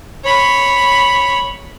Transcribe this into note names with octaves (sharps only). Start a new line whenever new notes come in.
C#5 B5